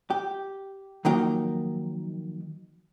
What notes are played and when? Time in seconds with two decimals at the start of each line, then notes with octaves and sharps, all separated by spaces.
0.10 G4
1.05 D#3 F3 F#3 A#3 D#4 G5